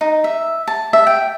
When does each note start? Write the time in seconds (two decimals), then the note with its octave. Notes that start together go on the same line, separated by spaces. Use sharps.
0.01 D#4
0.24 E5
0.67 A5
0.93 E5
1.07 G5